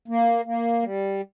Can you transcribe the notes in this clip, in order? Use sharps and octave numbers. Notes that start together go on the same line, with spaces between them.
A#3
A#3
G3